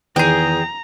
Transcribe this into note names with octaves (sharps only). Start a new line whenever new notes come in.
E2 D#3 G#4 G5 A#5